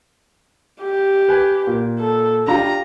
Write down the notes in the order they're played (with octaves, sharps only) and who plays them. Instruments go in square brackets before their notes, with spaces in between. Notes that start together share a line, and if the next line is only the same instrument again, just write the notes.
[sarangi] G4
[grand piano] B4 G#5
A#2
[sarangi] A4
[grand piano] D4 F4 G4 [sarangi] A#5